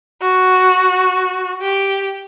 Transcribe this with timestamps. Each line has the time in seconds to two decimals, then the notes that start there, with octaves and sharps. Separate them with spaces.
0.22 F#4
1.62 G4